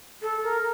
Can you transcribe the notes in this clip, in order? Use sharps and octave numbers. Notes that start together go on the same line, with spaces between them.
A4
A#4